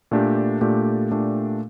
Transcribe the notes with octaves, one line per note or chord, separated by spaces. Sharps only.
A#2 A3 D4 G4
A#2 A3 D4 G4
A#2 A3 D4 G4